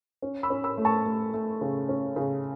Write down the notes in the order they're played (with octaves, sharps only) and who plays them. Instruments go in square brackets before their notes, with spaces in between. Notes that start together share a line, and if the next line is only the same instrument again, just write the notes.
[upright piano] C#4
B5 E6
C#4
B5 E6
A3
A5 C#6
A3
A3
C#3
C#4
C#3